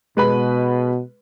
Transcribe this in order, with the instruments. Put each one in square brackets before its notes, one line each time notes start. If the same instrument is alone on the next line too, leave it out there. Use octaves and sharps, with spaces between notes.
[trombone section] B2 [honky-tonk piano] G#3 B4 B5